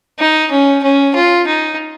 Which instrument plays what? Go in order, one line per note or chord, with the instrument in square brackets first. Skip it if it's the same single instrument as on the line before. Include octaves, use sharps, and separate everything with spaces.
[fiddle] D#4
C#4
C#4
F4
D#4